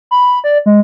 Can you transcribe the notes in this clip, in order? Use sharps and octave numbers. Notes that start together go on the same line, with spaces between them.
B5
D5
G#3